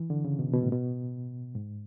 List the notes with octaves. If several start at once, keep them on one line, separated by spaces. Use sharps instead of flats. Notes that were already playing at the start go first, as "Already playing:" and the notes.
Already playing: E3
D3
C#3
B2
B2
A2
B2
G#2